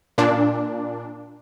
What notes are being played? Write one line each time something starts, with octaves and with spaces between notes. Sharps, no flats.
A#2 D4